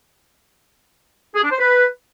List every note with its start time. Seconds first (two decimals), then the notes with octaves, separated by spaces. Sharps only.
1.35 G#4
1.43 D4
1.51 C5
1.59 B4